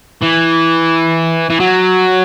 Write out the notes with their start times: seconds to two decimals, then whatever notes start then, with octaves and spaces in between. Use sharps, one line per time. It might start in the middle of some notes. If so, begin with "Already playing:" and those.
0.22 E3
1.50 E3
1.60 F#3